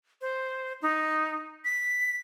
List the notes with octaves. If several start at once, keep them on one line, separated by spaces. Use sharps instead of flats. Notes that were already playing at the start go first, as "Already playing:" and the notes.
C5
D#4
B6